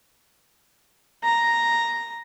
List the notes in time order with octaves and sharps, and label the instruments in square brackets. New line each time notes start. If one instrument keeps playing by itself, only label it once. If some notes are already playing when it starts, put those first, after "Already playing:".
[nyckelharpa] A#5